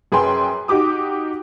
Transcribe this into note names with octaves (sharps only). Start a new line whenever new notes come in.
F#2 G#4 B4 G5 C6
D#4 F#4 G4 D6 D#6